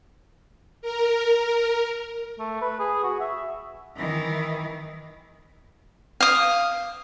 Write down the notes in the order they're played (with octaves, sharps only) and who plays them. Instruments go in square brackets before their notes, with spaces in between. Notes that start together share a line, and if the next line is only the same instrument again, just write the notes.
[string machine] A#4
[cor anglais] A3
B4
G#4
F#4
E5
[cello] D#3 E3
[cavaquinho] F5 D#6